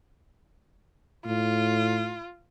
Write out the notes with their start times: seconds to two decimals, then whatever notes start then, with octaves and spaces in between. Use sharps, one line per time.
1.26 A2 F4